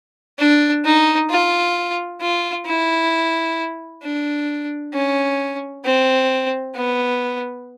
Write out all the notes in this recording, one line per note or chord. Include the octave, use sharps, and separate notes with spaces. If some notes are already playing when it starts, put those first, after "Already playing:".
D4
D#4
F4
F4
E4
D4
C#4
C4
B3